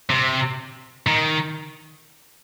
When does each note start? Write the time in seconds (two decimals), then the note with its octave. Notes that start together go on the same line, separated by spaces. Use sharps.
0.10 C3
1.07 D#3